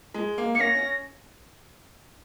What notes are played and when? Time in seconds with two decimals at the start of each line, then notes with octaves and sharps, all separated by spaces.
0.15 G#3
0.38 A#3
0.55 A#3 C#7
0.60 C#4 A#6
0.75 C#4